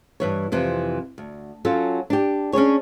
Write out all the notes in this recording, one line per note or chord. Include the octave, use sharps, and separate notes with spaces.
G2 E3 C#5
F2 C3 E3
D2
F#3 C#4 F4 A4
D4 G4
C#4 D4 G#4 C#5